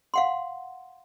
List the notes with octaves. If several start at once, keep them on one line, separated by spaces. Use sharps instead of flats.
F5 F#5 C6